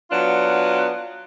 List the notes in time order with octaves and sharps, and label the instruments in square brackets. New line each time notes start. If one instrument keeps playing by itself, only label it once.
[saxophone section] F#3 B3 D4 F4